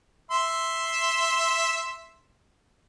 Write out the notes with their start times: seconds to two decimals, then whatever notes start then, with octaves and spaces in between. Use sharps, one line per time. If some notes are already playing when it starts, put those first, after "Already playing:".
0.31 E5 C6